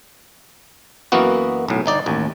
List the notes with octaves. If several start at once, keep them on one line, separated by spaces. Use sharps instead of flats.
F#2 E3 A#3 B3 F#4
B1 A2
G1 D#4 D5
A1 D#2